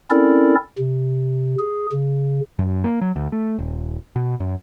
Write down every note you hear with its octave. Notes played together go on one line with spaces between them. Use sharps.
C4 C#4 E4 A4 A#4 D5
C3
G#4
C#3
F#2
A#3
F#3
D2
A3
D#1
B2
F#2